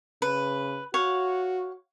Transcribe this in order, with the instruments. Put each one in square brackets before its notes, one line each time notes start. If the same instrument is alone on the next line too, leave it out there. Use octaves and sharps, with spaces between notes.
[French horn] C#3 [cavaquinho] B4
[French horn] F#4 [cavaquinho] C#5 F5 F#5